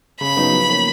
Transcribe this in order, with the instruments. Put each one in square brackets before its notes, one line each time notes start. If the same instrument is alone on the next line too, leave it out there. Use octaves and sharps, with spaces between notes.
[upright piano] C#3 [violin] B5
[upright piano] F#3 B3 D#4
F3
A#3 C#4